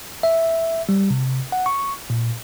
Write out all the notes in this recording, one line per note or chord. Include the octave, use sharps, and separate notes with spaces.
E5
G3
C3
F#5
C#6
A#2